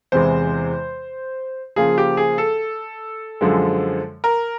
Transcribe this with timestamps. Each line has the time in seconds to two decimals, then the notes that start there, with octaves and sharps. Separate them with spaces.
0.12 E2 C3 E3 G#3 C5
1.76 C#3 F3 A#3 G#4
1.98 G4
2.17 G#4
2.38 A4
3.41 F#2 D3 F3 G#3
4.24 A#4